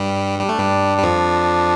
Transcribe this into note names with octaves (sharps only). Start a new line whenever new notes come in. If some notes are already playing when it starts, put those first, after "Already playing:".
Already playing: G2 G3
G3 D4
A3
G2 G3
G3
F2 F3